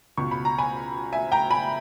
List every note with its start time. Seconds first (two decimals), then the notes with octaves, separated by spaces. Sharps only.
0.17 C#2 B2 C#6
0.31 B5
0.45 A#5
0.58 G#5 B5
1.13 E5 G#5
1.32 G5 A#5
1.51 G#5 B5